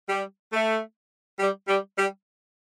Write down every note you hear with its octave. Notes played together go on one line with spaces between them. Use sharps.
G3
A3
G3
G3
G3